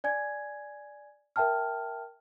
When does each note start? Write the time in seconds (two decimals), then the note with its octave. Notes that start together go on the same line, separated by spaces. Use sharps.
0.04 D5 G#5 G#6
1.36 A#4 E5 G5 A5 F6